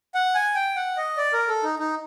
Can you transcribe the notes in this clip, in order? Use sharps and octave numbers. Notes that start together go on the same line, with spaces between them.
F#5
G#5
G5
F#5
D#5
D5
A#4
A4
D#4
D#4